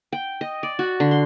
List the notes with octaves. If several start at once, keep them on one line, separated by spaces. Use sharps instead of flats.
G5
D#5
D5
F#4
D3
C6